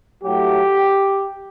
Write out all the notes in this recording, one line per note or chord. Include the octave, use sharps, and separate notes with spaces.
A2 F#3 A3 G4